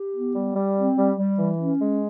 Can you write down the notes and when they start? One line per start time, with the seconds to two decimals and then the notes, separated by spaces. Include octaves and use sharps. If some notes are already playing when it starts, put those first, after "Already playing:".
Already playing: G4
0.15 B3
0.34 G3
0.55 G3
0.76 C4
0.97 G3
1.17 G3
1.38 E3
1.58 C#4
1.79 G#3